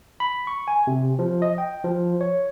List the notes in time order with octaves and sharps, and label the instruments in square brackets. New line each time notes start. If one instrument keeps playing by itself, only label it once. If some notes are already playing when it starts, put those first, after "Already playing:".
[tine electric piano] B5
C#6
G#5
C3
F3
D#5
G5
F3
C#5